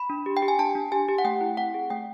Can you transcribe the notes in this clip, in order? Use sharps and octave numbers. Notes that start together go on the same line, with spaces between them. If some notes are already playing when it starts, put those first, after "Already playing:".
Already playing: B5
D4
G4
G5
G4
G#5
D4 A5
D4
G4 G#5
G4
F#5
A3 G5
E4
C4 F#5
G#4
A3 G5